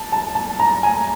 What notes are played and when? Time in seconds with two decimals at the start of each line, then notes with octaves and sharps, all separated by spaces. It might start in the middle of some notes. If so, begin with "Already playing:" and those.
Already playing: A5
0.12 A5
0.35 A5
0.60 A#5
0.83 G#5